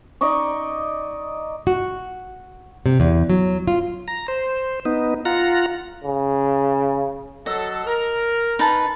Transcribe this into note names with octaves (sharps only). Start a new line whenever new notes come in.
D#4 D5 D#5 C#6
F#4
C3
E2
F#3
F4
A#5
C5
B3 D#4
F4 F#5 A#5
C#3
F#3 A4 D#5
A#4
D#4 B4 A5